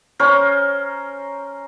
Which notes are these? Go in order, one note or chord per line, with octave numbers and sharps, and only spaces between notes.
C#4 A#4 C5